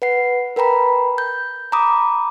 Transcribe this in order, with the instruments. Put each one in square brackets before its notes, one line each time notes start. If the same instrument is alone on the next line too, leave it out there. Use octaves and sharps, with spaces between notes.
[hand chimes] B4 F#5 C7
A#4 B4 G5 A#5 B5
G6
A#5 B5 D6 D#6